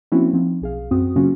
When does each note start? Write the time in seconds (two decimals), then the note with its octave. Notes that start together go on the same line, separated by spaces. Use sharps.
0.12 F3 A#3 C4 C#4 E4 F#4
0.33 F3 C4 D#4
0.62 B1 G#4 F5
0.91 F#2 C4 F#4 D#6
1.16 C#3 F#3 A#3 C#4 F4 F#4